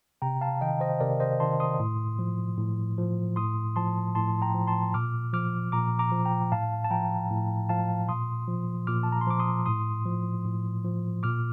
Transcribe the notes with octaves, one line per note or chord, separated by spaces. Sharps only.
C3 G5 A#5
F5 A5
D#3 D#5 G5
C5 D#5
C3 A#4 D5
C5 D#5
D#3 A5 C6
C6 D#6
A2
F3
A2
F3
A2 C6 D#6
F3 A5 C6
A2 A5 C6
G5 A#5
F3
A5 C6
A#2 D6 F6
F3 D6 F6
A#2 A#5 D6
A#5 D6
F3
G5 A#5
A2 F5 A5
A5
F3 G5 A#5
A2
F3 F5 A5
A#2 C6 D#6
F3
A#2 D6 F6
A5
A#5
C6
F3 D6
C6 D#6
A2 C6 D#6
F3
A2
F3
A#2 D6 F6